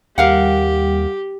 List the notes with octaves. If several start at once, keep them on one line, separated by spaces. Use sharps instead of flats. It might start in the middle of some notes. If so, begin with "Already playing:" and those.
D#2 G3 G4 A#4 F5 F#5